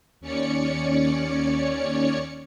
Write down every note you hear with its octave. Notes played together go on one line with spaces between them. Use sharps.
D#2 C#4 C#5 D5 C#7